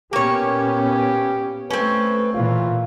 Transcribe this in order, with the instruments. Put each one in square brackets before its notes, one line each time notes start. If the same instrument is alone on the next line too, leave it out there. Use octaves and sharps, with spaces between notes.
[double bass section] A#2 B3 C#4 [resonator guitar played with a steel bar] A#3 C#5 [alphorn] G4
[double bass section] A3 [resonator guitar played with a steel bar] C4 C#4 [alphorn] B4
[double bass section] A#2 E3 [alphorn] F4